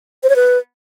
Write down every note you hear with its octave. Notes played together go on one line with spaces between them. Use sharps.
C5
C#5
B4